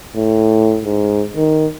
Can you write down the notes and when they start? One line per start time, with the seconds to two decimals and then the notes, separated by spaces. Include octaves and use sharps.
0.15 A2
0.85 G#2
1.36 D#3